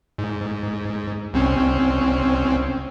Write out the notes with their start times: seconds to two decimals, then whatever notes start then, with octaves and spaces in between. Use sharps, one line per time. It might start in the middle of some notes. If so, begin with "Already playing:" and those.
0.18 G#2
1.34 C2 C4 C#4